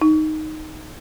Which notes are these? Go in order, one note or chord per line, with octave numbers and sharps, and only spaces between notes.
D#4